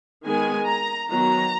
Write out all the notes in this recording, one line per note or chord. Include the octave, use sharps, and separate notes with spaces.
D#3 G#3 B3 G#5
A#5
D#3 F#3 B3 A#5